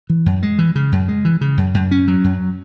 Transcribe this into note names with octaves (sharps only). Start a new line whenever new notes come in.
E3
F#2
G#3
E3
C#3
F#2
G#3
E3
C#3
F#2
F#2
C#4
F#3
F#2